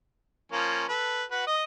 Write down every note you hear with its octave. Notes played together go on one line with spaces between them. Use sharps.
F3 A#3 C#4
A4 B4
F#4 B4
D#5 D#6